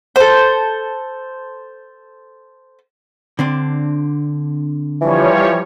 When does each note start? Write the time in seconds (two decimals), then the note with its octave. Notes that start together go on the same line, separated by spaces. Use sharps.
0.16 A4 C5
3.39 D3 C4 D4
5.01 E3 F3 G3 C#5